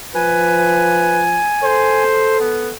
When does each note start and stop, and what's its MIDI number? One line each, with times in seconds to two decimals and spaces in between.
0.15 1.45 53
0.15 1.23 71
0.15 2.04 80
1.63 2.74 69
1.63 2.39 72
2.40 2.70 59